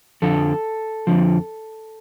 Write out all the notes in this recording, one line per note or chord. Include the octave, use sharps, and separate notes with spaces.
F2 D3 F3 A4
F2 D3 F3